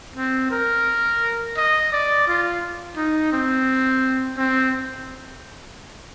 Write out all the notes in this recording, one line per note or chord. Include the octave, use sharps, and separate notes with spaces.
C4
A#4
D#5
D5
F4
D#4
C4
C4